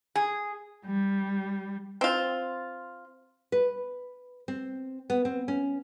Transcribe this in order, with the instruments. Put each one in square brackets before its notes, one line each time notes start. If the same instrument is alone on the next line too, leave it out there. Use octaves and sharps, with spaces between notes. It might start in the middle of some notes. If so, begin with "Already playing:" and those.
[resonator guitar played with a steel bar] G#4
[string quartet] G3
[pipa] C4 F4
[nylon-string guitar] B4
C4
B3
C4
C#4